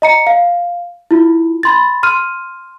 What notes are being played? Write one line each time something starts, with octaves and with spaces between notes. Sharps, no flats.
D#5 A#5 C#7
F5
E4 F4
B5 C6 A6
C6 F6 D#7